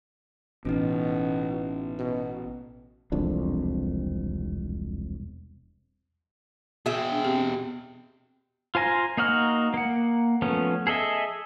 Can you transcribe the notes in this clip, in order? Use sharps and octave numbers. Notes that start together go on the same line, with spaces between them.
A1 B2 C#4 D#4
B2
E1 C2 F2 D4
B2 F#4 G#4 E5 G5
D4
C4 G4
F4 C5 G#5 A#5
A#3 D#4 F#4 F6
A#3 F#5
F3 A3 B3 C#4
G#4 A4 D#5 E5